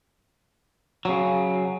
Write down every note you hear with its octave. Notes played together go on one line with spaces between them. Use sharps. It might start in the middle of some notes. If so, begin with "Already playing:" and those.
C#3 F#3